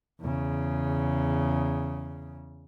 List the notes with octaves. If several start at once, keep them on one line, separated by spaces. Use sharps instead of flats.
E2 C#3